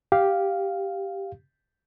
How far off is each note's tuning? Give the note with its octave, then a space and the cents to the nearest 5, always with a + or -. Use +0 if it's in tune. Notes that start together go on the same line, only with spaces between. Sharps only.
G4 +0 F5 +0